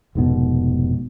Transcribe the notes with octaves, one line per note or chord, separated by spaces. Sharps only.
F1 G#2 B2